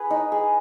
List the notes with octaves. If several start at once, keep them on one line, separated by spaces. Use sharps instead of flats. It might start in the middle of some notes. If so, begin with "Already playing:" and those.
Already playing: G#4 B4
D#4
G#4